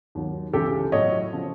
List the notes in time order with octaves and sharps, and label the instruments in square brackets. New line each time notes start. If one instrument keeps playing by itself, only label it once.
[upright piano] D#2 D#3 F#3
C#2 C#3 E3 G4 A4
A2 F#3 C#5 D#5
C#3 F3